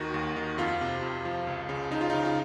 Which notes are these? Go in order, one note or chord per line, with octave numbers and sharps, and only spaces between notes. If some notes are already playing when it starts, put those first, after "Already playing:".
Already playing: D#2 D#3 F#4
D#2
D#3
F2 F4
C3
F2
F3
C#2
C#3
C#3 D#4
F4
C#3 D#4
F4